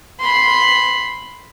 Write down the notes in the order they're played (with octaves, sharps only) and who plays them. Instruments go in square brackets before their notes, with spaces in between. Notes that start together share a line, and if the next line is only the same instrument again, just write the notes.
[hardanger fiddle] B5 C6